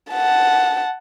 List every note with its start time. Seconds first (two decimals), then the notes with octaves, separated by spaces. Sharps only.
0.12 F#5 A5